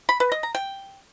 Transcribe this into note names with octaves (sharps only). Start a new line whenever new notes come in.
B5
B4
D#5
A#5
G5